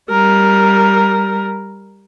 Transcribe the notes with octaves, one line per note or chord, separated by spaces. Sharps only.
G3 A#4